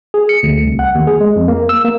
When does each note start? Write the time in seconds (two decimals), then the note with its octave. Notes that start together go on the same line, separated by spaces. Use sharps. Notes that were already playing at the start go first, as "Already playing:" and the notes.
0.14 G#4
0.29 C#7
0.43 D2
0.65 C2
0.79 F#5
0.95 D#2
1.07 G#4
1.21 G#3
1.36 F2
1.48 A#3
1.69 E6
1.84 A#3